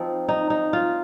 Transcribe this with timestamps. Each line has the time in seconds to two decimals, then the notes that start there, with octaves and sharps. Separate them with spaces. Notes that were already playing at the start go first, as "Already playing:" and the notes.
Already playing: F3 C4 D#4 F4
0.29 D#4
0.50 D#4
0.73 F4